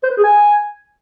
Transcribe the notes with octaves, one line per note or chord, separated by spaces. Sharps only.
C5
B4
G#4
G#5